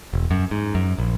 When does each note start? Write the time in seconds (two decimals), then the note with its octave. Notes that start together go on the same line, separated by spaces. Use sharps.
0.13 E1
0.31 F#2
0.51 G#2
0.75 F#2
0.98 A#1